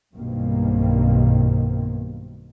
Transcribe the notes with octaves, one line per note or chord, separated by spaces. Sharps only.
B1 G2 B2 D#3 A#3 C4